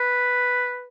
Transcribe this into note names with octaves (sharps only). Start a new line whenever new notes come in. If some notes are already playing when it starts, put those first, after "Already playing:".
Already playing: B4